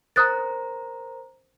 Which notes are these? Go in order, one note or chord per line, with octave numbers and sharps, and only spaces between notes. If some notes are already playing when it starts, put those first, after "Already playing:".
A#4 C5 A#5 D#6 F#6 A6